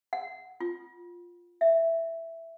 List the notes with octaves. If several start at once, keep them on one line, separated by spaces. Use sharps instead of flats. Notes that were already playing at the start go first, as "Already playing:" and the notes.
F#5
F4
E5